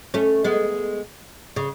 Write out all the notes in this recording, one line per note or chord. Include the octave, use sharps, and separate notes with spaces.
A3 C#4
G#3 B3
C#3